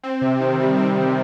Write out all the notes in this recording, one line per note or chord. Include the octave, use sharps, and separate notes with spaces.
C4
C3
D#3
G3
C4
C3